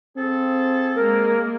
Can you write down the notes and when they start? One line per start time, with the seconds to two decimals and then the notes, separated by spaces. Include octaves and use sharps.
0.17 F3 C4 G#4 A4
0.95 G#3 A#3 A#4